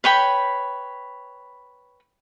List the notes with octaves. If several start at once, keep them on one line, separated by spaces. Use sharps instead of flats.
B4 C#5 G5 B5